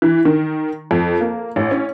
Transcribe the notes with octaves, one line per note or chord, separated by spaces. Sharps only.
E3
D#3
F2
A#3
A1
C#4